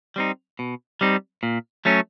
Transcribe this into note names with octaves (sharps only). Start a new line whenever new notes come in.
G3 C4 D#4
B2
G3 C4 D#4
A#2
F#3 A3 C#4